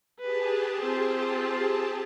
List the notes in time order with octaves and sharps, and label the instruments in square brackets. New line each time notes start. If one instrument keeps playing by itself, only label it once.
[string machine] G4 G#4 A5 [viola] B4
[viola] C4 F4